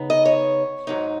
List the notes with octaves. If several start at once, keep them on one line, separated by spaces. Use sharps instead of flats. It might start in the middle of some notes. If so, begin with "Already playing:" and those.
Already playing: C#3 B3 D#4
D#5
C#5
G#2 F#3 D#4